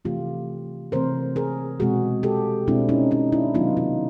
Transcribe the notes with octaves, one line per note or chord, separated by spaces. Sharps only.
C3 E3 A3 C4 F4 G4
C3 E3 A3 C4 A#4 C5
G#4 A#4
B2 G#3 C4 F#4 G#4
G4 A4
B2 G#3 C4 D4 E4
C#4 D#4
C#4 D#4
D4 E4
C3 D#3 F#3 B3 D#4 F4
D#4 F4